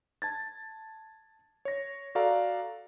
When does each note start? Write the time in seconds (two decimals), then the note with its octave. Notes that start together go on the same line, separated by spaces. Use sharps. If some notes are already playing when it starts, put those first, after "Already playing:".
0.22 A5 G#6 A6
1.65 C#5 A#6
2.15 F#4 A4 D5 F5 A#5